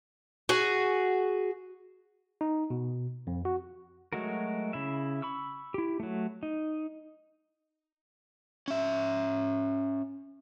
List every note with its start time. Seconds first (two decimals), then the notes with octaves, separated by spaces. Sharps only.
0.49 F#4 G#4
2.41 D#4
2.70 B2
3.27 F2
3.45 F#4
4.13 F#3 G#3 A3 F#4 A#4
4.73 C#3 E4 E5
5.22 B5 C#6 E6
5.74 E4 G4
6.00 F#3 A3
6.43 D#4
8.68 C#4 E5